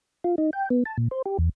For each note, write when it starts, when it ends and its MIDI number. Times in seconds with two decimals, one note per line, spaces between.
0.24 0.35 65
0.38 0.50 63
0.53 0.69 79
0.70 0.83 59
0.86 0.97 81
0.98 1.08 46
1.11 1.22 72
1.26 1.37 67
1.39 1.49 40